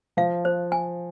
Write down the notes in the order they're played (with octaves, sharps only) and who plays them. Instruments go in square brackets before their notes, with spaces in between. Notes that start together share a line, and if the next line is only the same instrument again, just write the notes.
[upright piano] F3 [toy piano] F5
[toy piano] C5
G#5